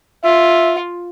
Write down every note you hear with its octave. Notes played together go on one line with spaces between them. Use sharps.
F4 E5